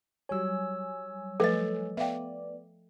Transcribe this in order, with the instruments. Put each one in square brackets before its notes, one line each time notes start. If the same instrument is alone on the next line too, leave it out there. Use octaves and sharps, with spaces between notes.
[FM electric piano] F#3 G3 G#5 [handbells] C#5 E6
[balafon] F3 A3 B4 [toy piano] A4 D#5
[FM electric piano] B3 D5 [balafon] E5 F5 G5